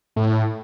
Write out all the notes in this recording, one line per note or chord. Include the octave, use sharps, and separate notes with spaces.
A2